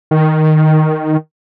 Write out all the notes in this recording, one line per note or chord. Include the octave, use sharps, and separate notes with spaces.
D#3